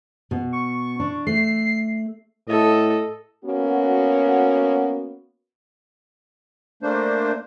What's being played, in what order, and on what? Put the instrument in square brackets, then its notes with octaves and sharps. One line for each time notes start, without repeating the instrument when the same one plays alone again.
[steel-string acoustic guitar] B2
[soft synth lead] C#6
[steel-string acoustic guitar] D4
[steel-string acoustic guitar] A3 [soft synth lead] C7
[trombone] A2 [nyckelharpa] A4 D#5
[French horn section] A#3 B3 C#4 F#4
[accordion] A3 A#3 D4 C5